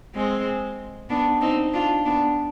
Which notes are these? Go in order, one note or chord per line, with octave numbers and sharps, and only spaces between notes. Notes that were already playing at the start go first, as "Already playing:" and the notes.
G#3 C4
B3 D4
C4 D#4
D4 F4
B3 D4